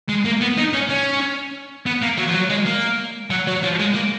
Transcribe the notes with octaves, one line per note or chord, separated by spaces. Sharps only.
G#3
A#3
B3
D#4
C#4
C#4
B3
A#3
F#3
F3
F#3
G#3
A#3
F#3
F#3
F3
G#3
A#3